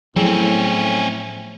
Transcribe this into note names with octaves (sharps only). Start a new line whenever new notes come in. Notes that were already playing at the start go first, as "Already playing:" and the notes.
A2 F3 F#3 C4 C#4 G#4